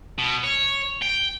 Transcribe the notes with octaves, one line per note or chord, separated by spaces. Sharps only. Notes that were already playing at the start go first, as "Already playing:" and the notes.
B2
C#5
G5